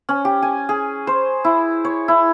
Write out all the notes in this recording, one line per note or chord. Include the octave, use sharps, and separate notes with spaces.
C#4
G4
G#5
G#4
C5
E4
C#5
E4